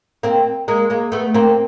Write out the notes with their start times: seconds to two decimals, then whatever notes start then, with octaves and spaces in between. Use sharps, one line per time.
0.23 A#3 C4
0.68 G#3 A#3
0.90 G#3 A#3
1.12 A3 B3
1.34 A#3 C4